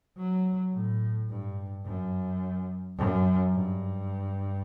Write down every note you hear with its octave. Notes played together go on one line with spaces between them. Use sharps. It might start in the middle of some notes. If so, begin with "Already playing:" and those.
F#3
A2
G2
F#2
F#2
G2